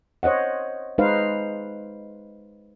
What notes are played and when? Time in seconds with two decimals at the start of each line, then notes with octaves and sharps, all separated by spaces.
0.23 C5 C#5 D#5 F#5
0.98 G#3 D#4 B4 C5 F5